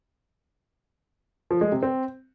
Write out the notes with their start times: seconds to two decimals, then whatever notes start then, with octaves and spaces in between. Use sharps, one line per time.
1.51 F3
1.61 G#3
1.72 C3
1.83 C4